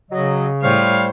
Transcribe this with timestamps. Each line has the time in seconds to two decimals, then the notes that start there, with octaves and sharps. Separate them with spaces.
0.11 C#3 F#3 D#5
0.63 A2 G3 C5 C#5 F5